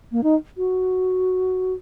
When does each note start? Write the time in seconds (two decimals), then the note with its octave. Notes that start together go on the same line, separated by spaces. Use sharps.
0.12 A#3
0.23 D#4
0.57 F#4